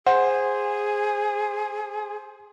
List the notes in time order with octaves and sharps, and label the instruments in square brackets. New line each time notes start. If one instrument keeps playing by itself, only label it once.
[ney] G#4 [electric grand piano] C5 [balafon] F#5